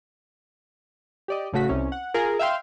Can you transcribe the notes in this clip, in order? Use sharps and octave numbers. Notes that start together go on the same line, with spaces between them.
G4 D5 D#5
A1 C#3 A3 F#4 B6
C2 C3 C#4
F#5
F4 G#4 A#4 F5
E5 F5 G5 C6